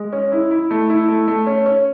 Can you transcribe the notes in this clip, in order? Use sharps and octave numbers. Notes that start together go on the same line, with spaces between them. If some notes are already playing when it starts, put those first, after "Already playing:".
Already playing: G#3
C#4
E4
E4
A3
E4
A3
A3
C#4
C#4